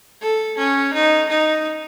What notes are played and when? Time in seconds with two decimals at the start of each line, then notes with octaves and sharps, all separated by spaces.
0.22 A4
0.58 C#4
0.94 D#4
1.29 D#4